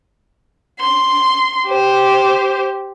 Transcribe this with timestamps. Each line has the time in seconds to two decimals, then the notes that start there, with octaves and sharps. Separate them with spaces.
0.80 C6
1.67 G4 C5